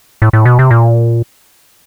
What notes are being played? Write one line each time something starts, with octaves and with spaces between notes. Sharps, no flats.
A2
A2
B2
C3
A#2